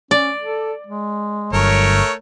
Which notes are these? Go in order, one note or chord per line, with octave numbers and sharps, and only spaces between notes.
C#4 D5
A4
G#3
G1 F#3 A3 A#4 C#5